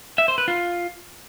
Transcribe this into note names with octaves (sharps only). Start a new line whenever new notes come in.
E5
C5
B4
F4